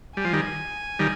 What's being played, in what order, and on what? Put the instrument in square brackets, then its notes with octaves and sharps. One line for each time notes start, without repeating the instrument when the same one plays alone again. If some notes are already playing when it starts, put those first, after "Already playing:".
[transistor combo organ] G3 [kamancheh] G#5
[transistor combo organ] F3
D#3 G3
D#3 G3